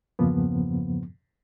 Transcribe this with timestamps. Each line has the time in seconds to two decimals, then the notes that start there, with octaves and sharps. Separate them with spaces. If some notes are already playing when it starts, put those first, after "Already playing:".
0.19 E2 G2 C#3 F3 A#3 B3